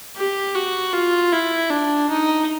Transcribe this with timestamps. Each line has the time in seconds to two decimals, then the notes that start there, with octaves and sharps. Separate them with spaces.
0.16 G4
0.55 F#4
0.93 F4
1.32 E4
1.70 D4
2.10 D#4